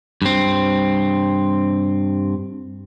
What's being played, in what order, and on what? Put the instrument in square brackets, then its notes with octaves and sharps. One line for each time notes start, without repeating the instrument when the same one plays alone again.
[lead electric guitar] G2 C4